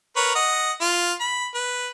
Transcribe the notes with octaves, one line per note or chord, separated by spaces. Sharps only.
A#4 B4 C#5
D#5 F#5
F4
B5
B4